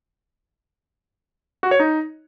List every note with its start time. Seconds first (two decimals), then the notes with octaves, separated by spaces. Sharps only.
1.63 F#4
1.71 C#5
1.80 D#4